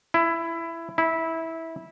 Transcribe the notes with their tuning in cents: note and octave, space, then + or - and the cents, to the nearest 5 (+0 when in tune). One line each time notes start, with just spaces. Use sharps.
E4 +15
E4 -15